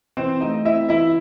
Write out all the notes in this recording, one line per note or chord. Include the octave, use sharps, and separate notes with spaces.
E3 C4 C5
A3 D#4 D#5
C4 E4 E5
E3 E4 E5